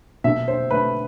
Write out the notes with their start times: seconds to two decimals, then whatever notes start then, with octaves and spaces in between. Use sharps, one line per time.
0.24 B2 E5
0.48 C5
0.71 A3 B4